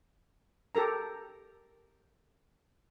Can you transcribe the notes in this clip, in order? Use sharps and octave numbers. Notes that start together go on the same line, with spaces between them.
G4 A4 A#4 A#5